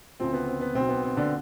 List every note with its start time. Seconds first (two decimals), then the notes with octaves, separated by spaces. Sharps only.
0.20 D2 C#3 F3 C4
0.33 B3
0.47 C4
0.61 B3
0.74 B1 B2 C4
0.89 B3
1.03 C4
1.17 D3 D4